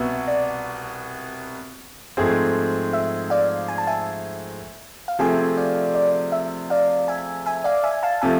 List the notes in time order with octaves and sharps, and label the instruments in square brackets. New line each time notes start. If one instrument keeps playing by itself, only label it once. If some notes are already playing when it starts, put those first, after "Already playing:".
Already playing: [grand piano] C2 B2 B3 [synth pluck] E5
[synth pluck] D5
[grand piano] G#2 F3 A3 C4 G#4
[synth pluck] E5
D5 F5
G#5
A5
E5 G#5
F5
[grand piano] C3 F3 A3 C4 G#4 [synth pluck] E5 G#5
[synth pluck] D5 F5
D5
E5
D5 F5
E5 G#5
E5 G#5
D5 F5
E5 G#5
F5 A5
[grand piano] C3 F3 A3 [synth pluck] E5 G#5